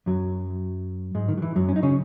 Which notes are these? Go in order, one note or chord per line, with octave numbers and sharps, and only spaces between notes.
F#2 F#3
G#2 G#3
D#3
F#3
E3
F#2 F#3
C#4
D#4
C#3 C#4